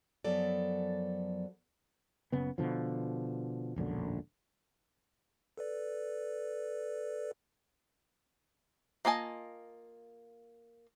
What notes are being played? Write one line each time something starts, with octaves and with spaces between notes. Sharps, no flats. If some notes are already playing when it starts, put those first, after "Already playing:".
F#2 F3 F#3 B3 A4 D5
F#1 C#3 B3
B2 D3 F3
E1 A#1 F#2 D3
A4 B4 D5
A#3 F4 D#5 G#5 A5